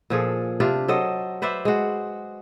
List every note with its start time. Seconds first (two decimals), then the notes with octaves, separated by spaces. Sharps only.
0.10 A#2 F3 G#4 A4
0.60 C3 D4 F4 G4
0.88 F#3 A4 C5 D#5
1.42 B4 C5 D5 E5
1.65 G#3 F#4